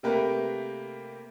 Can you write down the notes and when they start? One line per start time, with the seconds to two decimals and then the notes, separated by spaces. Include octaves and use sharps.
0.03 C3 A3 A#3 G4 A#4 B4